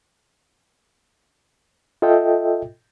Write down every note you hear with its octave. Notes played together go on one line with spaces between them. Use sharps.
F4 A4 D#5 E5 G5